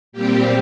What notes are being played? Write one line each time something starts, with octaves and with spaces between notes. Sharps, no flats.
A#2 G3 C4 G4